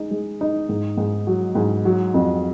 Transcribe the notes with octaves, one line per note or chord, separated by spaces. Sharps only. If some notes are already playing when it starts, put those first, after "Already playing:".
Already playing: G#3 D#4
G#3
D#4
G#2
G#2
F#3
G#2
F#3
F2